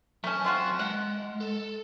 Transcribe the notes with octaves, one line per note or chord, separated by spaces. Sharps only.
F#3 A3 C#4 A5
C4 F4 F#4
G#3 F#5
A4